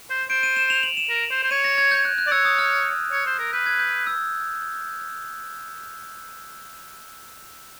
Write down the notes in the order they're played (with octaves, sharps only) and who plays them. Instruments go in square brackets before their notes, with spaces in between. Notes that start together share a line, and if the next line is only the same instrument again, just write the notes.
[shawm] C5
[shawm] C5 [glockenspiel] D7
[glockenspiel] D#7
E7
F7
F#7
E7
[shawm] A#4
C5
C5
[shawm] C#5 [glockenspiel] D#7
[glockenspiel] A#6
G#6
G6
F#6
F#6
[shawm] D5
[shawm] C#5 [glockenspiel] E6
[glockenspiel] D#6
F6
[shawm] C#5
C5
A#4
[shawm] B4 [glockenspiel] G6
[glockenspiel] G#6
G6
E6